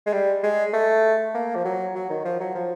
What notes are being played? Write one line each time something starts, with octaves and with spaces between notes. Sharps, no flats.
G#3
G3
G#3
A3
A#3
F3
F#3
F#3
D#3
F3
F#3
F3